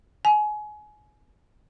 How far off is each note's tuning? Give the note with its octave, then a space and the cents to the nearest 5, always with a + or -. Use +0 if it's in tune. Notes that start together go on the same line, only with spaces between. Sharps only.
G#5 +25